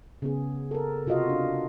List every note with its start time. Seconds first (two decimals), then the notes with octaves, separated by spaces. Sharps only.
0.22 C#3 B3 G#4
0.71 A4 A#4
1.07 C3 F4 F#4 D#5 F5
1.29 D4